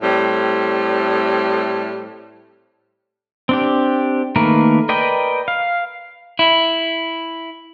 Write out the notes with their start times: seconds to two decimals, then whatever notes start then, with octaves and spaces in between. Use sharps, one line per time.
0.02 A2 G3 C4
3.49 C4 D4 G4
4.36 D#3 A3 A#3 A#4 B4
4.89 A#4 B4 D5 D#5 G5
5.48 F5
6.39 E4